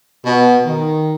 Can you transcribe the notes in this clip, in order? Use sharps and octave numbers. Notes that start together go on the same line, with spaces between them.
B2
D#3